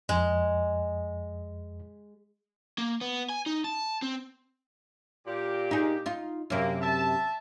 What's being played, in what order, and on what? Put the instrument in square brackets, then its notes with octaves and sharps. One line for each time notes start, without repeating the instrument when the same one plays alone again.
[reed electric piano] F2 [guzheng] G#3
[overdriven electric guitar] A#3
B3
G#5
D#4
A5
C4
[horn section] A#2 G4
[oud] D#4 G#4
D#4 F4
[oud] F#2 C3 [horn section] A#3
[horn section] E5 A5